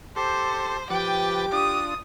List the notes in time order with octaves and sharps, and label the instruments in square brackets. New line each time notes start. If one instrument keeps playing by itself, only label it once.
[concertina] G4 A5 C6 [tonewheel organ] A4 [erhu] C5
[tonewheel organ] F3 B4 A6 [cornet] G4 [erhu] G5 [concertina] D6
[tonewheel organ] D4 F4 [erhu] D#6